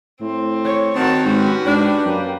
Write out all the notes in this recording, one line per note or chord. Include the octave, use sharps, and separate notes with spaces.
A2 C4
C#5
D#3 F#3 C4 F#4 A#4 C#5 A5
G#2 C#4 F#4 G4 B4
G#2 D4
F#2 A#3